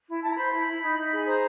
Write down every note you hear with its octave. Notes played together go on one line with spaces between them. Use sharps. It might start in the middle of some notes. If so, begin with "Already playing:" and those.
E4
E4 A5
A#5
C5 B5
E4
E4
D#4
D#4
G#4
C5 A#5